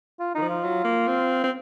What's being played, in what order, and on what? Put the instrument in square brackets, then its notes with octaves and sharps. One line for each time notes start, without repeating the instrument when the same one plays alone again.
[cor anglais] F4
[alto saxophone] D#3 [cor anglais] D#4
[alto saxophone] F3
[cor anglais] F4
[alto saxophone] F#3
A#3
C4
C4